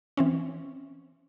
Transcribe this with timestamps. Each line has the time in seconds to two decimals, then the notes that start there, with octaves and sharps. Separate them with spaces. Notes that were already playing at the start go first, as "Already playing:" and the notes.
0.17 E3 C4 C#4